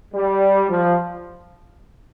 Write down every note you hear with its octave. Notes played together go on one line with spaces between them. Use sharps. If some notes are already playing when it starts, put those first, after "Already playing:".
G3
F3